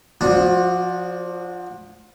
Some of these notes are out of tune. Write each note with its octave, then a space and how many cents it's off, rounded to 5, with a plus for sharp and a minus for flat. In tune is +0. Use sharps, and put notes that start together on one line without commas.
F3 +15 D4 +0 F#4 -20